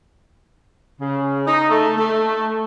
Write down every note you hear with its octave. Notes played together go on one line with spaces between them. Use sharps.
C#3
D#4
A3
A3